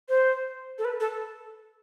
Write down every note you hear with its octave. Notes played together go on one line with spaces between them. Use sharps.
C5
A4
B4
A4